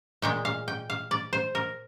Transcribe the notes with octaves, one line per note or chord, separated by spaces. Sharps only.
A#2 G#3 G5
F5
G5
F5
D5
C5
A#4